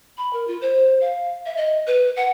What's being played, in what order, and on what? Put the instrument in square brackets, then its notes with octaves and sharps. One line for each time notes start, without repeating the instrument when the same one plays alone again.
[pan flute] B5
A#4
F4
C5
F5
E5
D#5
B4
F#5